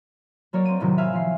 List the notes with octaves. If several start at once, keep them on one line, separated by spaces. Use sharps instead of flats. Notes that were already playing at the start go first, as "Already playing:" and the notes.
F#3 A#3 C#5 D5
C4 D#7
A2 C3 D#3 F#3 A3
E5 F5 G#5
F3 C7